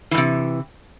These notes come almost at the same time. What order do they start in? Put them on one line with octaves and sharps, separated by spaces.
E3 G#2 C3